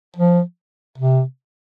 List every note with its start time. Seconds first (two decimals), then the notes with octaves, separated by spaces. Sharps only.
0.16 F3
0.98 C3